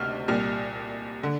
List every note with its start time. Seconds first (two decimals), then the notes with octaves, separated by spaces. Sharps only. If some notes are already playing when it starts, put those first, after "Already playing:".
Already playing: D2 C3 F6
0.28 C2 A#2 G3 F6
1.23 D3